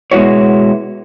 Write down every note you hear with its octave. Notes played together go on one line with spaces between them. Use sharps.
B2 G#3 B3 E4 F#4 C#5